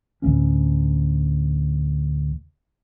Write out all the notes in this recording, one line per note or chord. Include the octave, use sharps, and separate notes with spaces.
D2 A2 A#3 C#4